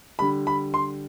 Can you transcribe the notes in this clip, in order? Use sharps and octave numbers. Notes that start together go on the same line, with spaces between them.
D3 G3 B5
B5
C6